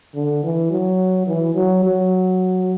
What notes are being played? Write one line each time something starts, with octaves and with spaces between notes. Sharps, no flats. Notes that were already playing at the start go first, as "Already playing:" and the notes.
D3
E3
F#3
E3
F#3
F#3